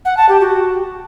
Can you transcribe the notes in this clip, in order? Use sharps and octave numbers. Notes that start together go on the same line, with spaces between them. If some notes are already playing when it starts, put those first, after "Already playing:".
F#5
A5
G4
F#4